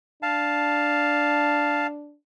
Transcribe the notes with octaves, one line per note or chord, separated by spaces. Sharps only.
D4 F5 A5